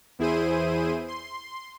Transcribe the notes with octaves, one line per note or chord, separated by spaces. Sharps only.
E2 E4 G#4 C5 D#7
C6